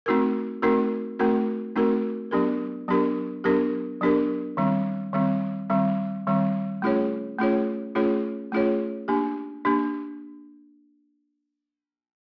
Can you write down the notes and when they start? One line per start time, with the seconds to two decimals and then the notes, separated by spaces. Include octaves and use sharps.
0.06 A3 C4 D#4 F#4 A#4
0.62 A3 C4 D#4 F#4 A#4
1.19 A3 C4 D#4 F#4 A#4
1.76 A3 C4 D#4 F#4 A#4
2.31 F#3 B3 D4 G4 A#4
2.88 F#3 B3 D4 G4 A#4
3.44 F#3 B3 D4 G4 A#4
4.01 F#3 B3 D4 G4 A#4
4.57 D#3 G3 C4
5.13 D#3 G3 C4
5.70 D#3 G3 C4
6.27 D#3 G3 C4
6.82 A3 C#4 F4 G#4 C#5
7.39 A3 C#4 F4 G#4 C#5
7.95 A3 C#4 F4 G#4 C#5
8.52 A3 C#4 F4 G#4 C#5
9.08 A#3 D4 G4
9.65 A#3 D4 G4